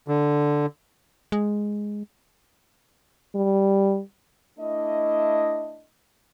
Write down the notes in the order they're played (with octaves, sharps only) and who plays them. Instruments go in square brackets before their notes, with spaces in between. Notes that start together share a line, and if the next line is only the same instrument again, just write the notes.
[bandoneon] D3
[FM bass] G#3
[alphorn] G3
[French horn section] A3 D4 E4 D#5